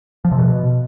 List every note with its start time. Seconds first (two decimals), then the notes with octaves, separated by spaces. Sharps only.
0.25 F3
0.31 C3
0.38 B2